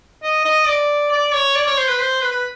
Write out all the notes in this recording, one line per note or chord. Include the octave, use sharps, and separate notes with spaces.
D#5
D#5
D5
D5
C#5
D5
C#5
C5
B4
C5
B4
B4